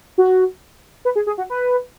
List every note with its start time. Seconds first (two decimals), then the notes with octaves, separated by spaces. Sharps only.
0.18 F#4
1.05 B4
1.16 G#4
1.27 G#4
1.38 F#4
1.50 B4